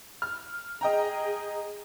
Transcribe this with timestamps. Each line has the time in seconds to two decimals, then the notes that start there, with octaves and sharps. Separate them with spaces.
0.22 F6
0.81 G#4 D#5 G5 A#5